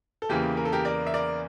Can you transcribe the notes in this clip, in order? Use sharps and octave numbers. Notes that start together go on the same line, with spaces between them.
A4
E2 C#3 E3 A#3 G4
A#4
A4
G4 A#4
A#4 D5
E5
A#4 D5